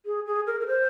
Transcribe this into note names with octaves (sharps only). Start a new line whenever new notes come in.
G#4
G#4
A#4
A#4
C5